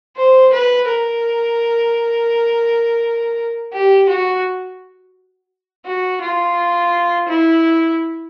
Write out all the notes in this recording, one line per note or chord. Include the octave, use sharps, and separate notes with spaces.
C5
B4
A#4
G4
F#4
F#4
F4
E4